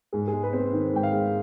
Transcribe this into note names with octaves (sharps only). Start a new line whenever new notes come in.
G#2 G#4
G#4
G#3
B4
C4
C5
D#3
G#2 G5
F5
G#3